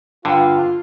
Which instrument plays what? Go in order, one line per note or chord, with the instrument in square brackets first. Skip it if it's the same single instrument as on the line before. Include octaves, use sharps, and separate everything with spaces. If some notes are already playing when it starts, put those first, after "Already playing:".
[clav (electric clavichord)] G2 D3 [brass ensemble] F4